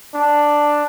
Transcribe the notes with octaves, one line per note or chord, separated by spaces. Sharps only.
D4